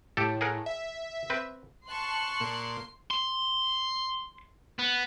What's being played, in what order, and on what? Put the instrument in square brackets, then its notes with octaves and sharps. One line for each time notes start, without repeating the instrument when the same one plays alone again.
[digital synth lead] A2 [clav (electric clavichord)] G4 A4
[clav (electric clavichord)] G#4 A#4 F#5
[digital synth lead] E5
[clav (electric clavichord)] C4 B4
[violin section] A5 C#6 F#6 [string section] C6
[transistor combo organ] A#2
[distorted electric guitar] C6
B3